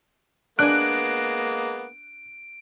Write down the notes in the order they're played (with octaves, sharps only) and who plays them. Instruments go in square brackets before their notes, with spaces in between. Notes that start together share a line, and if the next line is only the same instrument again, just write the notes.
[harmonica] G#3 A#3 B3 [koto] D4 G#5 [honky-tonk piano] F#6 [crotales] D7